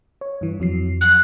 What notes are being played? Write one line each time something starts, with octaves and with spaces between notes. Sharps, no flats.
C#5
G2 E3
F2 F#3 C7
F#6